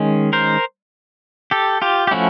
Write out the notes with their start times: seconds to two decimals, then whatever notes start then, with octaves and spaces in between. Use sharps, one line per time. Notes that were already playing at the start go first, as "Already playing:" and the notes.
Already playing: D#3 G#3 C#4
0.33 A#4 C5
1.51 G4 A4
1.82 F4 G4
2.07 G4
2.11 F3 A3 C#4 E4 F#4